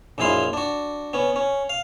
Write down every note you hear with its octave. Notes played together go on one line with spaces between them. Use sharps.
A#1 F#2 G#3 E4 F5 C6
D4 F#4
B3 C#4
C#4
F5